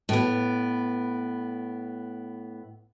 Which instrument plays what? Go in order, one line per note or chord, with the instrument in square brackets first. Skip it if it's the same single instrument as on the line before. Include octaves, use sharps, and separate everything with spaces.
[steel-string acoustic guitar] A2 B3